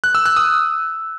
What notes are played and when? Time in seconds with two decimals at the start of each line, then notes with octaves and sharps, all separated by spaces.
0.04 F#6
0.15 E6
0.26 F#6
0.37 D#6